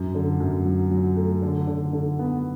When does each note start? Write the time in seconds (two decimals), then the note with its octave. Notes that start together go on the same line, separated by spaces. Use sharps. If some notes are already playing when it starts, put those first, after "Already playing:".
Already playing: F#2
0.15 D3
0.40 F#2
0.65 F#3
0.91 F#3
1.16 A3
1.42 D3
1.67 D3
1.93 D3
2.19 B3